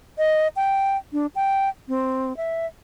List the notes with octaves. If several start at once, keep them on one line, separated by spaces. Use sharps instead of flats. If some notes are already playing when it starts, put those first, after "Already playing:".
D#5
G5
D4
G5
C4
E5